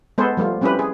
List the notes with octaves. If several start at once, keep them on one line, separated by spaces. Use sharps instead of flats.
G#3 B3 G#4 A4 B4 C5
F3 G3 A3 F4
G3 C4 C#4 E4 G4 B4
G#4